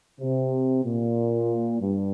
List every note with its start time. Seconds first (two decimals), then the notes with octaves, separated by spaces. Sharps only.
0.21 C3
0.84 A#2
1.80 G2